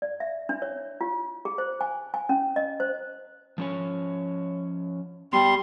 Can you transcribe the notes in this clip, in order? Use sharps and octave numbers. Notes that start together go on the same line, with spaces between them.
D5
E5
D4
C#5
F4
G#4
C5
G#5
G#5
C#4
D#5
C5
F3 C#4 C#5
G3 B3 G4 C6